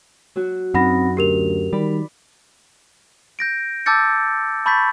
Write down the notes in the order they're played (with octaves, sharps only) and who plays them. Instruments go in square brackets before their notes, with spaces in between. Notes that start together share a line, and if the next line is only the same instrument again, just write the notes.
[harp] F#3 F#4
[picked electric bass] F#2 [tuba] C4 [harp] D#4 [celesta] F#5 B5 A#6
[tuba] D2 [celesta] G4 A#4 F7
[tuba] D#3 [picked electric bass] G3 [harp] D5 B5
[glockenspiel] G6 A#6 D7
A5 D6 E6 G6 A6 C#7
A5 B5 C#6 G6 A6 B6